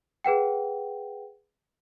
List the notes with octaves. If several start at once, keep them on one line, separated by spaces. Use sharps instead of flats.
G#4 B4 F#5 G5